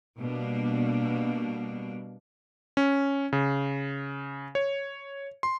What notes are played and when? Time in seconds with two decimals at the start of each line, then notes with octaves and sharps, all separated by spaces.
0.18 B2 G3 A#3 D4
2.77 C#4
3.33 C#3
4.55 C#5
5.43 C6